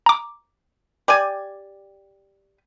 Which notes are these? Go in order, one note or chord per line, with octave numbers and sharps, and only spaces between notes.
A#5 D6
G4 D5 G#5